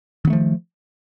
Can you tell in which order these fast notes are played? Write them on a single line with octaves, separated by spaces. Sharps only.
D#3 B3 A3 F3